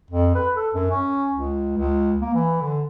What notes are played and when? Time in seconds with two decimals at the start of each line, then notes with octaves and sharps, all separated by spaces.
0.11 F2
0.35 B4
0.56 A4
0.74 F#2
0.91 C#4
1.33 C#2
1.77 C#2
2.21 A#3
2.34 E3
2.61 D3